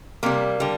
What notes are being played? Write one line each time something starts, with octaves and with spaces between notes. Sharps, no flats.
C3 G3 A#3
D3 G3